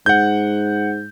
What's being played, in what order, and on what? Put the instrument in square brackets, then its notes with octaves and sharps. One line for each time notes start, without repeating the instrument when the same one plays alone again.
[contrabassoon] G#2 [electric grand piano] F#5 G6